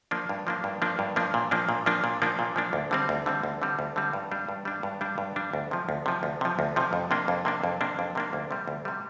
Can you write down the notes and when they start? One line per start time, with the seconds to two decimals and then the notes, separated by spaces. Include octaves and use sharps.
0.11 F3 A#3 D4
0.29 G2
0.47 F3 A#3 D4
0.64 G2
0.82 F3 A#3 D4
0.99 G2
1.16 F3 A#3 D4
1.34 A#2
1.51 F3 A#3 D4
1.69 A#2
1.86 F3 A#3 D4
2.04 A#2
2.22 F3 A#3 D4
2.39 A#2
2.56 F3 A#3 D4
2.73 D2
2.91 D3 G3 C4
3.09 D2
3.26 D3 G3 C4
3.43 D2
3.62 D3 G3 C4
3.79 D2
3.96 D3 G3 C4
4.13 G2
4.31 G3 D4
4.49 G2
4.65 G3 D4
4.83 G2
5.01 G3 D4
5.18 G2
5.36 G3 D4
5.53 D2
5.71 C3 F3
5.89 D2
6.06 C3 F3
6.23 D2
6.41 C3 F3
6.59 D2
6.76 C3 F3
6.93 F2
7.11 C3 A#3 D4
7.28 F2
7.45 C3 A#3 D4
7.64 F2
7.81 C3 A#3 D4
7.99 F2
8.15 C3 A#3 D4
8.33 D2
8.51 C3 G3
8.67 D2
8.85 C3 G3